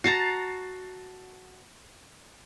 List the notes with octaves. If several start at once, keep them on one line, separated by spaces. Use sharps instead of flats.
F#4 A5 A#5 A6 C7